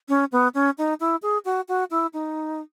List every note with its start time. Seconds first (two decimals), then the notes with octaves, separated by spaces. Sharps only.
0.09 C#4
0.32 B3
0.54 C#4
0.78 D#4
1.00 E4
1.22 G#4
1.45 F#4
1.68 F#4
1.91 E4
2.13 D#4